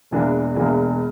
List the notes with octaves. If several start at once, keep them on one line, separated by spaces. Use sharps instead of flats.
E1 E2 E3 A#3 D4
E1 E2 E3 A#3 D4